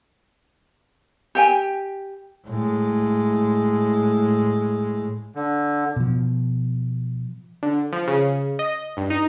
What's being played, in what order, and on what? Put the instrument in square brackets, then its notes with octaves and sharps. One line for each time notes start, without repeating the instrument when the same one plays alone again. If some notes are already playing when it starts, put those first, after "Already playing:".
[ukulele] G4 G5 G#5
[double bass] A2 G#3
[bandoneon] D3
[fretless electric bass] B2 F3
[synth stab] D3
F3
C#3
D#5
G2
D#4